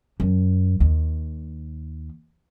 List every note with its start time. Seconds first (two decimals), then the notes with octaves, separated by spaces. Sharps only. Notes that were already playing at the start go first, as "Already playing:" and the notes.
0.20 F#2
0.80 D#2